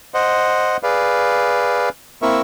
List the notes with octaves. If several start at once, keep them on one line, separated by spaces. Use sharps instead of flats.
C5 D#5 F#5
G#4 B4 D5 F5
A#3 C4 E4 A#4 E5 C#6